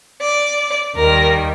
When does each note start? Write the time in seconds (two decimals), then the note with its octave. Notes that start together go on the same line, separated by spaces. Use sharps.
0.21 D5
0.95 D#2 D#3 G3 A#4